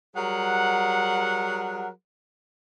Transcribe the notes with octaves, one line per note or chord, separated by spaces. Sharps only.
F#3 G3 G#4 A#4 F#5